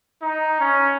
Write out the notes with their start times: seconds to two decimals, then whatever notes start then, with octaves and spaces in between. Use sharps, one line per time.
0.22 D#4
0.60 C#4